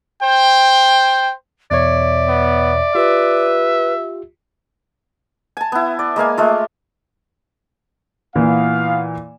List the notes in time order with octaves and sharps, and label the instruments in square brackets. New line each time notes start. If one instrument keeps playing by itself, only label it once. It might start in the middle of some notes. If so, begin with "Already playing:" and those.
[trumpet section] C5 G5
[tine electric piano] E2 B2 C#5 [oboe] D5 [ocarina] E5
[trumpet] B3
[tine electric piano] F4 G4 [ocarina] B4 [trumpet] E5
[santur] G#5 A5
B3 E4
D5
G#3 A#3 F5 G#5
G#3 A3 F4
[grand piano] A#2 E3 [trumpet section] B3 F5